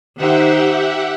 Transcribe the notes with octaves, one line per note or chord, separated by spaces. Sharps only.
D#3 D#4 G4 C5 E5 F#5